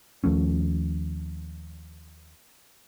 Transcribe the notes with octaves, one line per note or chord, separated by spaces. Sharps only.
D#2 F3 A3 C#4